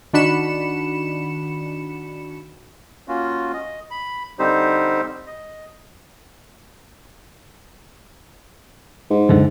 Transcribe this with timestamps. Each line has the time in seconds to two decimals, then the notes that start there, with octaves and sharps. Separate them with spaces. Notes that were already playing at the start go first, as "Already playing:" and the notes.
0.13 D#3 D4 F#4 B5 C#7 E7
3.08 A#3 C#4 F4 F#4
3.53 D#5
3.91 B5
4.39 D3 G3 C4 D#4 G4 C5
5.27 D#5
9.10 G#2
9.29 C#2 F#2 D3